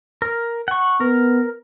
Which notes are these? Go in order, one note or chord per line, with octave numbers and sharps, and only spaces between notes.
A#4
F#5 C#6
B3 A#4